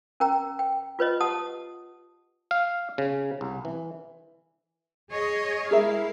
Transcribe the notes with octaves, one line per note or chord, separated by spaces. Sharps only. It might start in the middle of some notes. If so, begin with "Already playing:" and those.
C#4 A#4 G5 A#5
G5
F4 B4 C#5 D#5
G4 F#5 A5 D#6
F5
C#3
C2
E3
G#4 C#5 D#5
G#3 E4 G#4 A#4 E5 F5